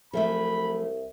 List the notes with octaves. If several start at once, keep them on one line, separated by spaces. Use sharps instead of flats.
C2 F3 F#3 A3 G#4 E5 B5